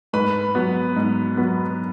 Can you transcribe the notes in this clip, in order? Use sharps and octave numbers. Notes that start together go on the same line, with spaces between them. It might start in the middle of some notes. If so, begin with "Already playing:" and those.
G#2 B4 B5
F#3 B3
G#2
F#3 B3